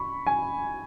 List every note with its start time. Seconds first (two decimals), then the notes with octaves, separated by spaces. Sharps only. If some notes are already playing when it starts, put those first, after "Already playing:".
Already playing: B5 C#6
0.27 G#5